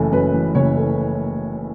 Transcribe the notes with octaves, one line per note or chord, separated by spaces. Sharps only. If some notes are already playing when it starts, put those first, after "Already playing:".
Already playing: F#1 F#2 E3 A3
F#2 B4
E3
F#1 C#5
A3